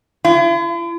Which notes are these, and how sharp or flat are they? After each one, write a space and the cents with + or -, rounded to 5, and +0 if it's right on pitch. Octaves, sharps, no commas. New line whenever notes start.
E4 +45